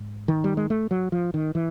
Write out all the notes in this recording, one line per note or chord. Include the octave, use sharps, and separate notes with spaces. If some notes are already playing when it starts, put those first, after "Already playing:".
Already playing: G#2
D#3
G3
G#3
A3
F#3
F3
D#3
E3